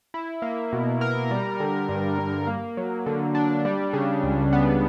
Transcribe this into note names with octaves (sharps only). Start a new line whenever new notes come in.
E4
A#3
B2
A#4
G3
D3
G2
G2
A#3
F#3
D3
D4
G3
C#3
C#2
B3